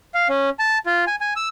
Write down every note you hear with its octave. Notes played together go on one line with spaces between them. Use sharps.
F5
C#4
A5
F4
G#5
G#5
E6